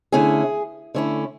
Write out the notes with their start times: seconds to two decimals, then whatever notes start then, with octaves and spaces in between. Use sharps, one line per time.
0.12 D3 A3 C#4 E4 G#4
0.95 D3 A3 C#4 E4